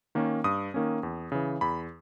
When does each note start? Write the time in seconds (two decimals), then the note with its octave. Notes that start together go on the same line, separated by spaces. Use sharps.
0.15 D#3 A#3 C#4
0.44 G2 D#6
0.74 D#3 A#3 C#4
1.03 E2
1.32 C#3 E3
1.61 E2 B5